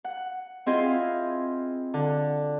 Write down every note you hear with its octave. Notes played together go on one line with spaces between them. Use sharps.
F#5
C4 E4 F4 G#4 D#5 C6
D3